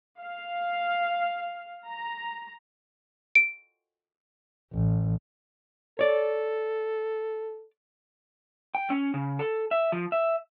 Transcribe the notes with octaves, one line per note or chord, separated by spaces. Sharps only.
F5
A#5
D7
A1
A4 C#5 D5
G5
C#4
C#3
A4
E5
F3
E5